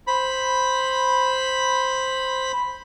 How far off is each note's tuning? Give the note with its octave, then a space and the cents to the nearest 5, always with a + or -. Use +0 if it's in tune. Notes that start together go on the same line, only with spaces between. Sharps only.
C5 +0 B5 +0